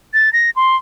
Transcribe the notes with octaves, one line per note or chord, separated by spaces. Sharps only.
A6
A#6
C6